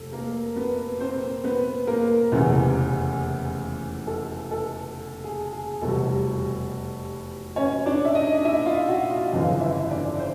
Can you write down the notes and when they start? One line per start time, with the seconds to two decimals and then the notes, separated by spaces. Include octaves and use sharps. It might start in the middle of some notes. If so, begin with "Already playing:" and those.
Already playing: F1 A4
0.12 A#3 A#4
0.56 B3 B4
1.00 C4 C5
1.44 B3 B4
1.87 A#3 A#4
2.32 F1 E2 C#3 E3
4.07 A4
4.51 A4
5.24 G#4
5.53 G#4
5.81 F1 E2 B2 G3 A4
7.56 C#4 C#5
7.86 D4 D5
8.05 E5
8.15 D#4 D#5
8.45 E4 E5
8.66 F4 F5
8.88 F#4 F#5
9.10 F4 F5
9.31 G1 F2 C#3 E3 F4 F5
9.61 E4 E5
9.90 D4 D5
10.19 C5